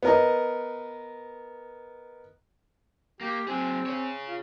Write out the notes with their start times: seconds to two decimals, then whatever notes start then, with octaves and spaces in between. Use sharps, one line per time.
0.03 B3 A#4 D#5
3.21 A#3 G4
3.48 F#3 C4 G#4
3.86 G#4 C#5
4.28 F4